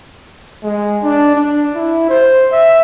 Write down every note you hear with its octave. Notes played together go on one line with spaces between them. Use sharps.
G#3
D4
D4
E4
C5
E5